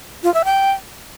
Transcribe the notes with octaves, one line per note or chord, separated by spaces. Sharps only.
F4
E5
G5